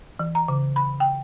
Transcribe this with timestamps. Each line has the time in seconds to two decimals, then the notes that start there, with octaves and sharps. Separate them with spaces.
0.19 E3
0.35 A#5
0.48 C#3
0.76 B5
1.00 G5